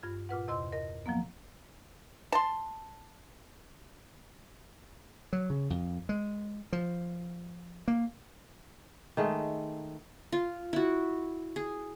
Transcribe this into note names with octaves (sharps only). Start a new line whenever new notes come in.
G2 F4 G#6
A#2 F4 B4 F#5
E2 C3 D#5 C6 E6
A#4 D#5
F3 F#3 A#3 B3
A5 C6
F#3
C#3
F2
G#3
F3
A#3
D#3 G#3 A3
F4
E4 F#4
G#4